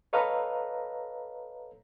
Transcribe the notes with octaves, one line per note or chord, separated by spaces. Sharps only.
A4 B4 C#5 D#5 F5 A#5